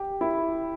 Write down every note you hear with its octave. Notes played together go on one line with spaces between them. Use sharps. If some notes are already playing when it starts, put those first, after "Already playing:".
Already playing: G4
E4